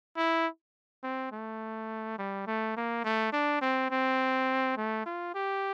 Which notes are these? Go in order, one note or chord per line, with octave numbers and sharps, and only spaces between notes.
E4
C4
A3
G3
A3
A#3
A3
D4
C4
C4
A3
F4
G4